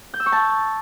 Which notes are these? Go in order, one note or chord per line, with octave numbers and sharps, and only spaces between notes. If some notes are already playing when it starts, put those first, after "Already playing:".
G6
E6
C#6
A5